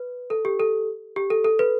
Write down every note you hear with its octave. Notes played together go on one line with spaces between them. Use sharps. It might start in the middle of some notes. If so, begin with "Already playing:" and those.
Already playing: B4
A4
G4
A4
G4
A4
A4
B4